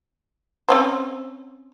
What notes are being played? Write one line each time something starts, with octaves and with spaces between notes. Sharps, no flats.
C4 C#4 C5